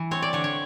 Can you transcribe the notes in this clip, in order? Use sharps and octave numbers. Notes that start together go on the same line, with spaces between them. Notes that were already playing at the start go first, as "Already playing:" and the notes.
Already playing: E3
C4 C#5
D5
D3 C#5
C#5